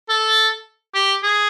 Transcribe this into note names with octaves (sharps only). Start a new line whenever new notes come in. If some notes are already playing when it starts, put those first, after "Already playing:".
A4
G4
G#4